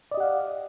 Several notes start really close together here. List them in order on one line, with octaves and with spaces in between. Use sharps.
D5 D#5 G4 F#5 F5